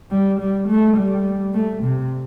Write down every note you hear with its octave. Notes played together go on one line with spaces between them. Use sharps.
G3
G3
A3
G3
A3
C3